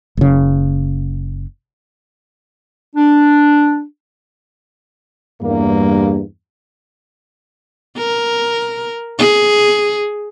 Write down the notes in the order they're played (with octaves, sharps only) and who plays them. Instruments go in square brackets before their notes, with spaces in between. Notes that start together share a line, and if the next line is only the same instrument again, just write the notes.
[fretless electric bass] F#1 C#3
[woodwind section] D4
[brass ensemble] E2 G2 A#3
[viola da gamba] A#4
G#4